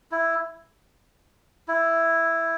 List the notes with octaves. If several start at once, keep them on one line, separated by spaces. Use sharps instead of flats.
E4
E4